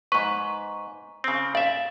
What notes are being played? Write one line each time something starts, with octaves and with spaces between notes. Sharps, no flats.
G#2 B4 C#6
C#3 C4
D5 E5 F5